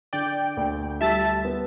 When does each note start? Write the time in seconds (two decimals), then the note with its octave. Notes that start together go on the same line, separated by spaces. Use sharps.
0.13 D3 D5 G5
0.57 D2
1.01 G3 E5 A5
1.45 B3